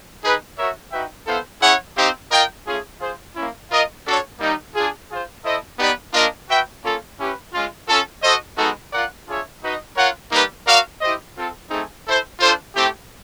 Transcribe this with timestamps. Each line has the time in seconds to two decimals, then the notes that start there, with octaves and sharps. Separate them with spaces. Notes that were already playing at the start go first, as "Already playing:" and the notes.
0.23 D#4 G#4 B4
0.58 F#4 A#4 C#5 E5
0.92 D#4 F#4 B4 E5 G5
1.26 B3 E4 A4 C5 F5
1.61 C#4 E4 G#4 C#5 F#5
1.96 C4 D#4 G4 C5 F5
2.31 F4 A#4 D#5 G5
2.66 A3 C#4 F4 G#4
3.00 F4 G#4 C5
3.35 A#3 C#4 E4
3.70 F4 A#4 D#5
4.05 D4 F#4 A4 C#5
4.39 G3 A#3 D#4
4.75 D4 F4 G#4
5.10 F4 G#4 C5
5.44 E4 A4 C5 D#5
5.79 B3 D#4 G4 B4 D5
6.13 A#3 D4 F4 A#4 D#5
6.48 F#4 B4 E5 G5
6.84 A#3 C#4 F4 A4
7.19 C#4 E4 G4 B4
7.54 G#3 C#4 F4
7.88 C#4 F4 A4
8.22 F#4 A4 C5 D#5
8.57 G#3 B3 D#4 F#4 A4
8.92 F4 A#4 D5 F#5
9.28 D4 F4 G#4 C#5 E5
9.62 D#4 F#4 B4 D#5
9.97 F4 A#4 C#5 F#5
10.31 G3 A#3 D#4 G4 B4
10.66 F#4 A#4 D5 F5
11.01 E4 G4 C5 D#5
11.36 C4 F4 A4
11.70 A3 C4 D#4 G#4
12.06 E4 A4 C5
12.40 D4 F4 A4 C5
12.75 A3 C4 E4 G4